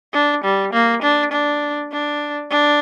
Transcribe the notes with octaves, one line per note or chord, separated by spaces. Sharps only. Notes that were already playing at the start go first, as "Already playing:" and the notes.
D4
G3
A#3
D4
D4
D4
D4